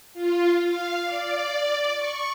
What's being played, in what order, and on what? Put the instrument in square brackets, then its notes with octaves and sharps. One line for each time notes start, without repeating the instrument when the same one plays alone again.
[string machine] F4
F5
D5
C#6